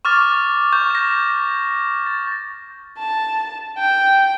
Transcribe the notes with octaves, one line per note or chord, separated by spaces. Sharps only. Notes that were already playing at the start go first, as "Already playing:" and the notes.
C#6 D6 F6 A6
C#6 G6
A#6 E7
A6
A5
G5